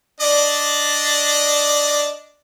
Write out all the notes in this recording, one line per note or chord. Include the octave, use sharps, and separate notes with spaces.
D4 D5 D#5